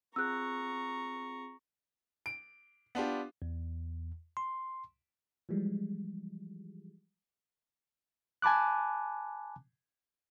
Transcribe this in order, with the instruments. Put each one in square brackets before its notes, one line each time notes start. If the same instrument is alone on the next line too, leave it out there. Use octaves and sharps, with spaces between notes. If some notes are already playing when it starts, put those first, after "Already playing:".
[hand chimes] C4 F4 G#4 [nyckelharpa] A#5 C#6 [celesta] E6 F#6
[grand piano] D7
B3 D4 F4 G4
[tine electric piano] E2
C6
[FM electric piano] E3 F3 G3 G#3
[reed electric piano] G#5 A5 B5 D6 F#6